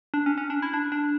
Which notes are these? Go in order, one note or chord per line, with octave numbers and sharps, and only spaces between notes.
D4
C#4
C#4
D4
E4
D4
D4